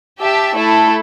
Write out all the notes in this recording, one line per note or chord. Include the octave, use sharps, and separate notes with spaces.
G4 E5 A5
A3 E4 A4